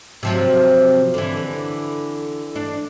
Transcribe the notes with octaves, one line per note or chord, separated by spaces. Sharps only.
C3 F3 F#3
D3 E3
D4